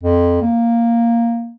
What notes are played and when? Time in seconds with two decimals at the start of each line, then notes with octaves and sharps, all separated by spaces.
0.03 F2
0.41 A#3